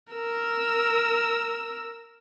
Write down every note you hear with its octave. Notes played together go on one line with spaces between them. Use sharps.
A#4 E6